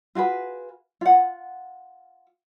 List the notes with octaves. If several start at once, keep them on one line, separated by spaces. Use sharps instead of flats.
F4 F#4 G#4 B4
F4 F#5